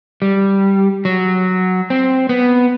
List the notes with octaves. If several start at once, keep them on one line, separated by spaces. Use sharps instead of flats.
G3
F#3
C4
B3